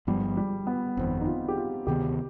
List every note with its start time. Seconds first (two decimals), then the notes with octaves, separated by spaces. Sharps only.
0.07 G1 G2 F3 G3 B3
0.37 G3
0.67 B3
0.97 G1 F2 D#3 C4
1.21 D#4
1.27 F4
1.48 G4
1.58 F4
1.87 D2 C3 D#3 B3 G4